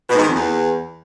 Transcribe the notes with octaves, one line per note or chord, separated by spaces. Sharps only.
B2
G#2
D#3
F2
E2